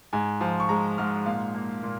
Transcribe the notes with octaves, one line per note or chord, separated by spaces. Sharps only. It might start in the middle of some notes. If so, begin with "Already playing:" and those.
G#2 G#5
F3
C#6
G#3 A#5
G#2 F6
A#2 F5
A#3
A#2